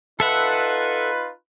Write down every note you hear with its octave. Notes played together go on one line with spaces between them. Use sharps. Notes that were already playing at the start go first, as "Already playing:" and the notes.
D#4 F4 A4 B4 E5 F#5